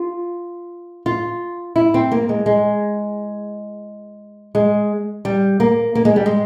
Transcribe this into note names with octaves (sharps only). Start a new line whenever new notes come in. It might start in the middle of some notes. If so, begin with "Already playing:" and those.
Already playing: F4
F4
E4
C4
A#3
G#3
G#3
G#3
G3
A#3
A#3
G#3
G3
G#3